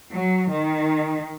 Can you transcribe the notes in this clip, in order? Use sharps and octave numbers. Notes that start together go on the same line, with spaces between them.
F#3
D#3